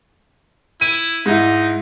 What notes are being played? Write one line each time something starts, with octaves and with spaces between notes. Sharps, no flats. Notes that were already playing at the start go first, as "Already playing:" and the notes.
E4 D#7
G#2 D#4 E4